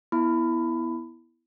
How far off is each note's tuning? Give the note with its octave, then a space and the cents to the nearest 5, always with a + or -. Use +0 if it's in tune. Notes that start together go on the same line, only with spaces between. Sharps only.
B3 -5 E4 +0 B5 +20